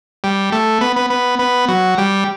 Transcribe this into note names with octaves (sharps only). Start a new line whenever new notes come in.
G3
A3
B3
B3
B3
B3
F#3
G3